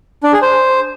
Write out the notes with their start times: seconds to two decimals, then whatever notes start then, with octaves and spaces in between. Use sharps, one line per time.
0.23 D4
0.33 G#4
0.42 C5